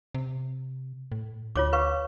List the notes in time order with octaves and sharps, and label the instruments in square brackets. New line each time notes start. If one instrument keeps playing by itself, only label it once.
[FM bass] C3
A2
[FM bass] D2 [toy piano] F4 C#5 D6
[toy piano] B4 F5 C#6